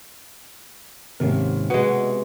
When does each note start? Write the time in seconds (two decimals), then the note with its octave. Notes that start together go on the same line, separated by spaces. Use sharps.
1.20 G#2 C3 D#3 A#3 C#4 A#4
1.70 B2 G#3 F#5